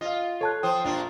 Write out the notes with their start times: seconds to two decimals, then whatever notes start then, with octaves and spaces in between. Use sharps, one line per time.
0.01 F4 D#5 F5
0.41 A4 C#5 A5 F#6
0.63 F3 C5 G5 D#6
0.84 A#1 A#3 D4 F4 A#5